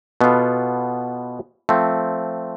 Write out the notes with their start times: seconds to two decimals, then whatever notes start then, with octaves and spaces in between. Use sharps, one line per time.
0.21 B2 B3 F4 A4
1.69 F3 A3 C4